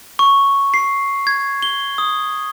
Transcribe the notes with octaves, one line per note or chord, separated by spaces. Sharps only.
C#6
C7
G#6
G7
D#6